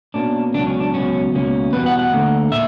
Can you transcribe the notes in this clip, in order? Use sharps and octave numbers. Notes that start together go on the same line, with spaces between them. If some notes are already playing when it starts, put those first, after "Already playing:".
B2 A#3 C#4 D4
C#2 B2 F#3 D4
C#4
D4
C#2 B2 F#3 B3 C#4
C#2 B2 A#3 C#4
E2 B2 G3 B3 B4
F#5
F#5
D2 D3 A#3
A#2 E5